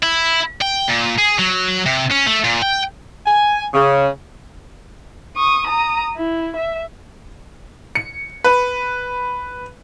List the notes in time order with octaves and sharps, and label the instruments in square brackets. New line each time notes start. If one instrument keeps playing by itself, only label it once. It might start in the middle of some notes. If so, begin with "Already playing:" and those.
[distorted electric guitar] E4
G5
A#2
G#4
F#3
C3
C#4
A3
A#2
G5
[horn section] G#5
C#3
[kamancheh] C#6 D#6
A#5 D#6
E4
E5
[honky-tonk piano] C#7
B4